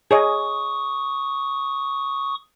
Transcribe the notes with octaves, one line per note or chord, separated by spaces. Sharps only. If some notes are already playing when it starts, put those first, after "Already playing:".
G#4 C#5 D#5 C#6 D#6